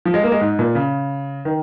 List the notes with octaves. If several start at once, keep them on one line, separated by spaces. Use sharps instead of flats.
F3
G#3
A#3
G#3
G#2
A#2
C#3
D#3